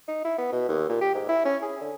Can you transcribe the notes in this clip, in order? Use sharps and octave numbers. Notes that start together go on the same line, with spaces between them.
D#4
E4
B3
B2
D#2
A#2
G4
G#2
E4
C#4
G#4
D3